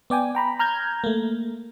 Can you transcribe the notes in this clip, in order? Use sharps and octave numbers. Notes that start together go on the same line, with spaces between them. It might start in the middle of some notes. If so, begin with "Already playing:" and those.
B3 D5 G5 G#5
G5 A#5 B5
A#5 F6 G6 G#6
A3 A#3